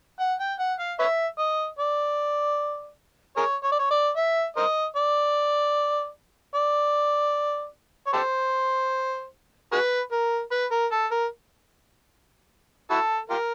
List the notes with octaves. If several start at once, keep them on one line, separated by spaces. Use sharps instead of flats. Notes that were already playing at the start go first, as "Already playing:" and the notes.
F#5
G5
F#5
F5
B4 C#5 E5
D#5
D5
G#4 A#4 C#5
C#5
D5
C#5
D5
E5
A#4 C5 D#5
D5
D5
C#5
G4 A4 C5
F#4 G#4 B4
A#4
B4
A#4
A4
A#4
E4 F#4 A4
F4 G4 A#4